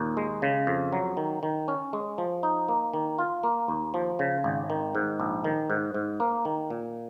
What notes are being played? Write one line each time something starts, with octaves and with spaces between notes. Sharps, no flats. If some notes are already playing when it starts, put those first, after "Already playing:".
Already playing: D#2 A#2
G#3
C#3
F2
F#3
D#3
D#3
C#4
G#3
F3
D#4
A#3
D#3
F4
A#3
D#2
F3
C#3
G#1
D#3
G#2
A#1
D#3
G#2
G#2
A#3
D#3
A#2